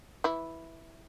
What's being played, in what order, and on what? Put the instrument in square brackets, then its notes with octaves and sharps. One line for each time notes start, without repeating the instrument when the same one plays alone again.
[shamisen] E3 E4